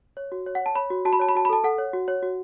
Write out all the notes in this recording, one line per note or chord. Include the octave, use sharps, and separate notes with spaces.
C#5
F#4
C#5
F#5
C#5 A5
C#5 B5
F#4
F#4 A5
B5
C#5 A5
B5
F#4 A5
B5
A4 A5
A4 F#5
C#5
F#4
C#5
F#4